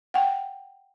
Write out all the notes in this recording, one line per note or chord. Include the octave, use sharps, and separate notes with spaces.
F#5 G5